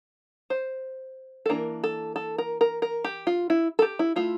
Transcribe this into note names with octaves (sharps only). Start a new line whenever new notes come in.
C5
A4
E3 A#3 D4 A#4
A4
A4
A#4
A#4
A#4
G4
F4
E4
A4
G4
E4
A3 E4 F4